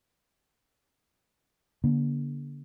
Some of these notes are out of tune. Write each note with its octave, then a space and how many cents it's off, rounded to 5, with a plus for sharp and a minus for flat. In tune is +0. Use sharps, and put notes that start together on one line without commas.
D3 -25 A#3 +40